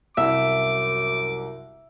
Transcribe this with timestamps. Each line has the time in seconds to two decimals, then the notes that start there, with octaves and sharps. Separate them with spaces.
0.17 C2 F#2 E5 D6